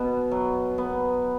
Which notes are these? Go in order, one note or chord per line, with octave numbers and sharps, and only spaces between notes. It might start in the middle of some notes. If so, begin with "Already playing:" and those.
Already playing: B2 B3
F#3
B3